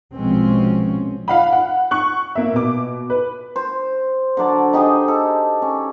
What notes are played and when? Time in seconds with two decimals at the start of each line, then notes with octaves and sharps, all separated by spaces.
0.14 A#1 B2 F3 G#3 C4 C#4
1.28 F5 F#5 B5
1.53 F#5
1.91 C#6 F#6
2.35 A#3 E5
2.53 B2 D6
3.10 B4
3.56 C5
4.37 D3 F#3 D5 A5
4.73 D#4 G4 G#4 D#5
5.08 A4
5.62 C#4